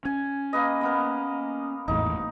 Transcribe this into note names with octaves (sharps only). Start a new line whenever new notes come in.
C#4 G#5
A#3 B4 D#5
A#3 B3 A#4
G#1 E2 A2 D#4